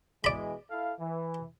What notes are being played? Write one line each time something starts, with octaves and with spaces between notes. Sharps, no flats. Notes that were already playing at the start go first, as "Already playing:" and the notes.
B2 E3 G#3 D5 B5
E4 A4 F5
E3